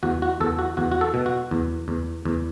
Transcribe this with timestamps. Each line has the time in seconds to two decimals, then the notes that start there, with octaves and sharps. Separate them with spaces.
0.03 E2 F#4
0.22 F#4
0.40 E2 A4
0.59 F#4
0.77 E2 F#4
0.92 F#4
1.01 A4
1.14 B2
1.26 F#4
1.51 E2
1.88 E2
2.25 E2